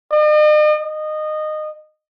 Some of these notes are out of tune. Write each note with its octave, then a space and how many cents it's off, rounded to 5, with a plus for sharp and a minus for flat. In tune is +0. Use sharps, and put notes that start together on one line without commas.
D#5 -45
D#5 -20